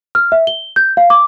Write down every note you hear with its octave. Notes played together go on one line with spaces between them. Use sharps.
F6
E5
G7
G6
F5
D6